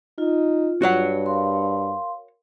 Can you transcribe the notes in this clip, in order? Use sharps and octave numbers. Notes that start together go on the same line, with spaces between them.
D#4 F4
G2 F#4 C#5 F#5
A#4 F5 C6